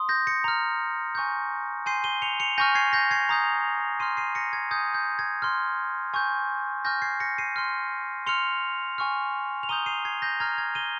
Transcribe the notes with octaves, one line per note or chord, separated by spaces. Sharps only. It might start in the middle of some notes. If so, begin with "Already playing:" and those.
Already playing: C6 D#6
G6 A#6
A#6 C#7
A#5 F6
G#5 C#6 G6
G#5 C6 G6 C7 D#7
D#7 G7
C#7 F7
C#7 F7
G#5 C#6 F6 G6 A#6
G#6 C7
G6 A#6
G#6 C7
A#5 D#6 G6
C6 F6 C7 D#7
C7 D#7
A#6 C#7
G#6
G#5 D#6 G6 G#6
G6
G#6
C6 F6
G#5 C#6 G6
G#5 C#6 F6 G6 A#6
G#6 C7
A#6 C#7
C7 D#7
C6 F6
C6 F6 C#7 F7
G#5 C#6 F6
F7
A#5 D#6 G6 D#7 G7
C7 D#7
G#6 C7
G6 A#6
A#5 F6 G#6
G#6
D#7 G7